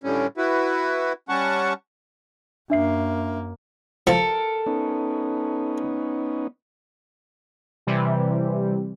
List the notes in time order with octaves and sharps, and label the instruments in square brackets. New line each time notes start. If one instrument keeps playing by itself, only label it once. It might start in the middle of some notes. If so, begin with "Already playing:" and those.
[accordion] A2 D3 G3 C#4
E4 F#4 B4
G3 C#4 F#5 A5 C#6
[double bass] F#2 A#3 [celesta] D4 E5 C7
[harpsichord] F3 [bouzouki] A4 A#4
[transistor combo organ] B3 C#4 D#4
[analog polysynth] C3 E3 G3